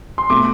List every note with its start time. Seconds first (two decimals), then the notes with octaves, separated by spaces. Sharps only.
0.18 C6
0.30 B2 A3 D6